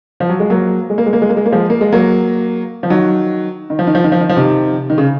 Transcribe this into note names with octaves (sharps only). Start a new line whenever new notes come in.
F3
F#3
G#3
F#3 A#3
G#3
A#3
G#3
A#3
G#3
A#3
G#3
A#3
F3 G#3
A#3
G#3
F#3 A#3
F3
D#3 F#3
D#3
F3
D#3
F3
D#3
F3
D#3
F3
C3 D#3
D#3
C#3